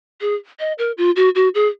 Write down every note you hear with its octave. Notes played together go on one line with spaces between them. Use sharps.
G#4
D#5
A#4
F4
F#4
F#4
G#4